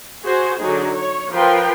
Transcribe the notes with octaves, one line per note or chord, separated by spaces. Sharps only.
F#4 G#4 C5 G#5
D3 F#3 D#4 G#4
C#5
F3 F4 A#4 B4 G5 C6